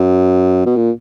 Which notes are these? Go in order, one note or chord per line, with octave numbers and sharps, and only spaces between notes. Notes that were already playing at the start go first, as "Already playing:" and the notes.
Already playing: F#2
B2
A#2